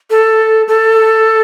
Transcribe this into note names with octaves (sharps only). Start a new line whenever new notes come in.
A4
A4